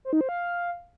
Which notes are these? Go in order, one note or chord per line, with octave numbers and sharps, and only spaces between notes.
C5
D#4
C5
F5